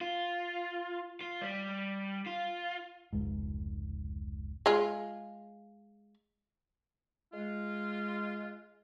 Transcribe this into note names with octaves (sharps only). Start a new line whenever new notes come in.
F4
F4
G3
F4
F1 C#2 G#2
G#3 F4
G#3 F4